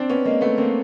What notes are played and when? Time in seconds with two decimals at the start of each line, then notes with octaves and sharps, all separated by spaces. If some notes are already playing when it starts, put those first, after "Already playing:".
Already playing: C4 D4
0.10 B3 C#4
0.25 G#3 A#3
0.41 A3 B3
0.58 A#3 C4